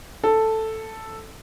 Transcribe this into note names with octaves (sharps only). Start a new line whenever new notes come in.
A4